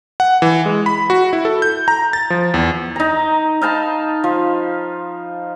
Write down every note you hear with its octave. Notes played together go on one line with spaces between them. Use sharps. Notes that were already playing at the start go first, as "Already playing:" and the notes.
F#5
E3
G#3
B5
F#4
E4
A4
G6
A#5
A6
F3
E2
D#4 A#5
D#4 F5 A5 B5
F3